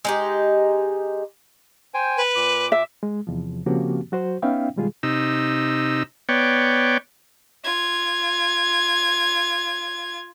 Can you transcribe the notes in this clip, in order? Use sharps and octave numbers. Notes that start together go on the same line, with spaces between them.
G#3 D#4 G4
C5 G5 G#5
B4
A#2 D6
E5
G#3
E2 C3 F3
C#3 F3 A#3 C4 F#4 G4
F#3 F#4 C5
B3 C#4 D#4 E5 F5 G5
B2 D#3 G3 G#3 F4 G#4
C3 D#4 E6
B3 C#5 D5 G5
F4 G#6